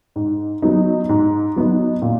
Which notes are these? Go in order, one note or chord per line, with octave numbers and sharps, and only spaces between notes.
G#2
F#3 B3 D#4
G#2
F#3 B3 D#4
A#2